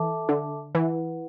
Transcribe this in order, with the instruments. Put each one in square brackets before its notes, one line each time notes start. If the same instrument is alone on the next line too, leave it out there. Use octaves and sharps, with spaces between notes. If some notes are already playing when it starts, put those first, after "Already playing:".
Already playing: [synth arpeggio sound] E3 [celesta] A4 E5 A5 D6
[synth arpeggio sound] D3
[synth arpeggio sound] E3 [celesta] E4 B4 F#5